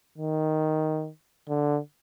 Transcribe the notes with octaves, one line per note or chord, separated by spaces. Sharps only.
D#3
D3